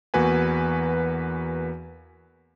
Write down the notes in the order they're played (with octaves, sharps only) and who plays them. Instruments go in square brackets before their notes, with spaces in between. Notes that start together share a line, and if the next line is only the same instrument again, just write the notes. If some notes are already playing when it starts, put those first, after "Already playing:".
[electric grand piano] E2 A#3 F#4 B4 G#5